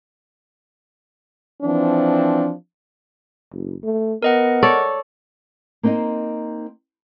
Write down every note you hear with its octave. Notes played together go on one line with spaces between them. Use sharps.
E3 F3 C4 D4
F#1
A3
B3 A#4 D#5 F#5
A4 C#5 D5
A#3 C4 D#4 C5 D#5